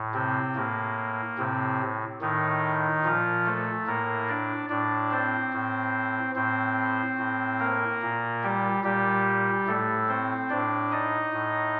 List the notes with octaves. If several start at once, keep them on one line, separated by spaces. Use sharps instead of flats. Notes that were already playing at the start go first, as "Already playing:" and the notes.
Already playing: A2
C3 C4
A2 A#3
A2 C3 C4
A2 D#3 D#4
A#2 F3 F4
A3 A4
A2 A#3 A#4
D4 D5
A2 D4 D5
C4 C5
A2
A2 C4 C5
A2
A#3 A#4
A#2
G3 G4
A#2 G3 G4
A2 A3 A4
C4 C5
A2 D4 D5
D#4 D#5
A2